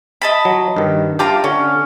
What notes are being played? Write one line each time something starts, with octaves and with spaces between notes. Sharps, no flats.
D#5 A5 B5
F#3
G2 D#3
D4 F4 G4 A#5
D3 C#4